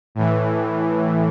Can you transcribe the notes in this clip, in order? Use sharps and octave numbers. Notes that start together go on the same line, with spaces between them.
A2 E3